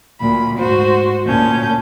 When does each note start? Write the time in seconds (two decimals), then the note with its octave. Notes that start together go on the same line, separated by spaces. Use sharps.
0.20 D2 A#2 B5
0.58 G#2 F#4 C5
1.26 D2 A#2 C#4 A5 G6